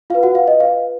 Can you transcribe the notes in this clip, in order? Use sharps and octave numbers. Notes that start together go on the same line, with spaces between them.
F4 B4 F5
F#4 F#5
F5
D#5
F5